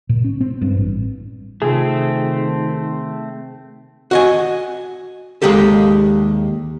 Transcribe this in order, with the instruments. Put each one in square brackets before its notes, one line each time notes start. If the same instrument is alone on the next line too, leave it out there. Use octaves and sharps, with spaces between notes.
[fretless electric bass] A#2
C#4
C4
G2
A1
[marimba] C3 F4 [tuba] D#3 [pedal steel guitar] A3 C4 [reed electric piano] G#4
[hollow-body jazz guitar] F#4 D#5 G#5
D#2 D3 G#3 A#3 G4 A4